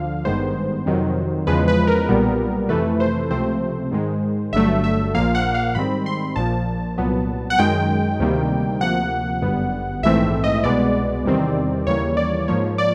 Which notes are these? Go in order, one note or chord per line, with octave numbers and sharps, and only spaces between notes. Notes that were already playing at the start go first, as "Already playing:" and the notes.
Already playing: D2 D3 F3 F5
G#1 G2 D#3 G#3 B3 C5
F2 C3 D#3 F#3
E2 C#3 F3 G#3 B4
B4
A#4
B1 A#2 G3 B3
F2 C3 E3 A3 B4
C5
C#2 C3 F3 A3 C4 C5
G#2 D#3 G#3
G1 G2 D3 F#3 A3 E5
E5
A#1 A#2 F3 A#3 F5
F#5
F5
G#2 D#3 G3 C4 B5
C6
A#1 A#2 F3 A5
C2 A#2 F#3 B3
F#5
F#2 D#3 G#3 G5
D2 C3 D#3 G3 A#3
D2 C3 F3 A#3 F#5
G1 F#2 D3 G3 B3
A#1 G#2 E3 A3 C4 E5
D#5
C2 B2 G#3 B3 D5
E2 C3 D#3 G3 C4
D#2 C#3 E3 G3 A#3 C#5
D5
G#2 F3 A#3 C#5
D5